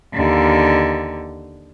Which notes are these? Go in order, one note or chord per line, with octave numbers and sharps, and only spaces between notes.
D#2 D3